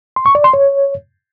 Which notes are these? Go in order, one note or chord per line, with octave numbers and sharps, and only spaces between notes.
C6
C#6
D5
C6
C#5